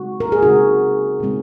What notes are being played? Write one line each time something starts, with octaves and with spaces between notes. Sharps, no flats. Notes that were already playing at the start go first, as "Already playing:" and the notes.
Already playing: C#3 G#3 C4 D#4 F#4
A#4
G#4
C#3 G#3 C4 D#4 F#4
C#3 G#3 C4 D#4